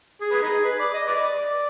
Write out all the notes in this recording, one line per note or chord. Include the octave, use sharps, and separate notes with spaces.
G#4
B4
D#4 G#4
B4
D5
D#5
B4 D5